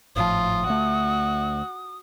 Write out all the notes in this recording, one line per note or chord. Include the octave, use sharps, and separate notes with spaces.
G#1 A2 F3 F4 D#6
D2 A3 F#4